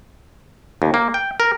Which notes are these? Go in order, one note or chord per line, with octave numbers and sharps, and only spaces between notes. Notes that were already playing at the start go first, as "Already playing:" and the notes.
D#2
A#3
G5
A#4